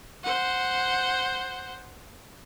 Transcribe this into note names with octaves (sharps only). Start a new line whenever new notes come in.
C5 F#5